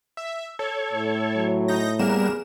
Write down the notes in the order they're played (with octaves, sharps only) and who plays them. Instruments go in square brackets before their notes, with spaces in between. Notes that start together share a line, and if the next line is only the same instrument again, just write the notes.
[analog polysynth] E5
[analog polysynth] A4 [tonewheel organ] C#5
[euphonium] A2
[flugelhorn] F#3
[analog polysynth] D#4 G6 A#6
[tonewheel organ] G3 B3 [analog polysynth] A#3 A#4 E7 [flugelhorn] G#4